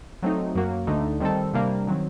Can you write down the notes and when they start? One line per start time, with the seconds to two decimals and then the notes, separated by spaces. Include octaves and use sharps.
0.23 F#3 A3 C4 D#4
0.55 F#2 F#3 A#3 F#4
0.87 D2 D3 A3 D#4 A4
1.20 D#3 G3 C4 D#4 A4
1.53 C3 G3 A#3 D4
1.87 D#3 F#3 C4